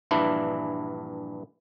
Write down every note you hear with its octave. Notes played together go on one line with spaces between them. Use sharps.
A#1 G2 E3 D4 E4